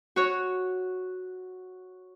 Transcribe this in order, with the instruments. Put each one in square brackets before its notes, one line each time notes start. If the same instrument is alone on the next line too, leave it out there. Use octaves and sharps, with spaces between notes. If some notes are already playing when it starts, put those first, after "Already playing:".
[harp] F#4 C#5